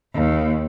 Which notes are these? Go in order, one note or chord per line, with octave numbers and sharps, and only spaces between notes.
D#2